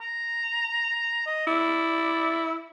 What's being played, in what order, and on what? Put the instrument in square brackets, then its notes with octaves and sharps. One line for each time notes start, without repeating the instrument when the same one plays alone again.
[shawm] A#5
D#5
[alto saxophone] E4 [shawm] D5